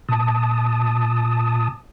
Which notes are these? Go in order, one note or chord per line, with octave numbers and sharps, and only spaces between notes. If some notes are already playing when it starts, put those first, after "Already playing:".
A#2 A5 D#6